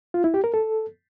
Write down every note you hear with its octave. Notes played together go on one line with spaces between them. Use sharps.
F4
E4
G4
A#4
A4